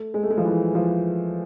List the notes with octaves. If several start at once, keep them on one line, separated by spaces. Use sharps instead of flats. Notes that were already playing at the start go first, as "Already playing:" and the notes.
Already playing: A3
G#3
A3
G#3
F3
E3
F3